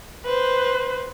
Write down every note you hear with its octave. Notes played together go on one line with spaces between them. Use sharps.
B4 C5